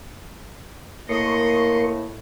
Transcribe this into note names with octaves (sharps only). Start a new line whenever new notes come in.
A2 A#3 A#4 D#5 C6 C#6